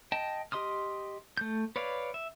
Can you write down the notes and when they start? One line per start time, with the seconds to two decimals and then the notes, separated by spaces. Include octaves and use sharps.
0.12 D#5 G5 A5
0.52 G4 D#5 C6 D#6 F6
1.37 A3 G6
1.76 B4 C#5 D5 F5
2.14 E5